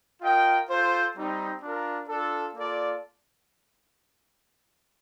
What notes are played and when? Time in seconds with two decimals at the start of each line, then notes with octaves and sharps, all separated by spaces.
0.22 F4 A#4 D#5 G5
0.68 F4 A4 C5
1.15 G3 C4 D#4
1.62 D4 F4 A#4
2.08 D4 F4 A4
2.55 A#3 F4 A4 D5